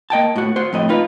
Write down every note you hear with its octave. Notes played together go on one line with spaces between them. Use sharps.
A#3 D#5 G5 A5
A2 F#4
F#4 C5
F2 A2 D#5
D#4 F4 B4